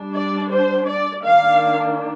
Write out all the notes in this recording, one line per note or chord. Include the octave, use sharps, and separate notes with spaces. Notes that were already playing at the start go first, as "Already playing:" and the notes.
Already playing: G3 D4
D5
C5
D5
D#3 A#3 D4 F5